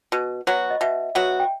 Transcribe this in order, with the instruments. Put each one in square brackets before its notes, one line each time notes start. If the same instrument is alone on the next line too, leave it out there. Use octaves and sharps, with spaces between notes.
[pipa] B2
F#3 B3 F#4
[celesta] D#5
[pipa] B2 [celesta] E5
[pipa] F#3 B3 F#4
[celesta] G5